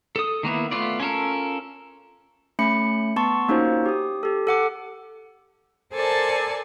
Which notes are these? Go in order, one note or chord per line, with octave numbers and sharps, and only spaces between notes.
A4 D#6
D#3 A#3 B3 E4
A3 B3 F4 D5
C#4 F4 A4 A#4
A3 C#4 B5 C#7
B3 A5 C6 C#6
A#3 C#4 D#4 F4 F#4 C5
G4 D#6
G4 A4
A4 F#5 D6
A4 A#4 C5 D5 G#5 A5